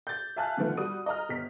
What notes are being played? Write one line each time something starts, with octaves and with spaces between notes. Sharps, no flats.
G6 A6
E5 F5 G#5 A5 F6 F#6
B2 D3 D#3 F3 A3 B3
G3 F#4 D#6 D#7
D#5 A#5 F6
G1 B6